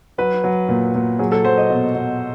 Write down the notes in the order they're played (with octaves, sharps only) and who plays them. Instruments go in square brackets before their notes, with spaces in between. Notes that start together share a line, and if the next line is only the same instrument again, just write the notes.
[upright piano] F#3 B4
F#3
A#2
A#2
F#3 G#4
A4
F#3 C5
D#5
B2
B2